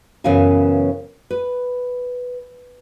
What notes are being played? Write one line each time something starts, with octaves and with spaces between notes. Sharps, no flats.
F#2 C#3 E3 B3 F5 G#5
B4